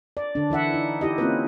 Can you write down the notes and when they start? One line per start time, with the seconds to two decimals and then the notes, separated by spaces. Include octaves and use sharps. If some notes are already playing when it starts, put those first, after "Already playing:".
0.17 D5
0.35 D3 D4
0.50 E3 E4 E5 F#5
0.74 D#4
1.01 D#4 E4 G4 D#5
1.18 A#3 C4 C#4 E4 F4 B4